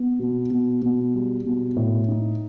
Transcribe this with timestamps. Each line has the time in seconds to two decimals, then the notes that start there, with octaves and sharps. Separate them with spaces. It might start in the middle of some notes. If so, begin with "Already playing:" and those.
Already playing: B3
0.19 B2
0.50 B2
0.82 B2
1.14 G3
1.45 B2
1.76 A2
2.09 D#4